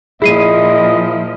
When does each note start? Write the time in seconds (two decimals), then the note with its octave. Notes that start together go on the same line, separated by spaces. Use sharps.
0.22 A#2 F3 E4 G#4 D#5 C7 D#7